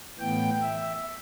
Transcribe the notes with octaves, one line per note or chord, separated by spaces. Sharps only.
A2 E3 B3 G5
E5